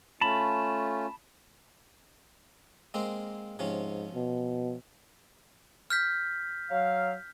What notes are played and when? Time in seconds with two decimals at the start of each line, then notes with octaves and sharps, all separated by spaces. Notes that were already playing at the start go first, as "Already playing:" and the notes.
0.21 A3 C#4 F4 A5 B5
2.94 G#3 A#3 C4
3.59 G#2 C3 F3 C#4
4.15 B2
5.90 F6 G6 B6
6.71 F#3 F5